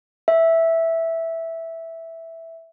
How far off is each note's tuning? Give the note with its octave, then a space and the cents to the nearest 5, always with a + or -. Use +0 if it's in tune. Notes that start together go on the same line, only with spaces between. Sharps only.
E5 -5